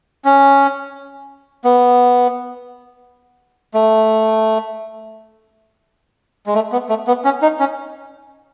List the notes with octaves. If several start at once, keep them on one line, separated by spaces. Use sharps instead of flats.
C#4
B3
A3
G#3
A3
B3
A3
B3
C#4
D#4
C#4